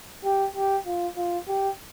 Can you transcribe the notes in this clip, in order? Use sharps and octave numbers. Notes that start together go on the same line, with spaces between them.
G4
G4
F4
F4
G4